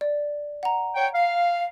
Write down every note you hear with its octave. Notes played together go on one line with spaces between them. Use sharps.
D5
F#5 A#5
C#5 G5
F5